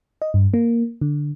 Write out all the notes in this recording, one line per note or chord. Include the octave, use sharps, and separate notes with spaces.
D#5
G2
A#3
D3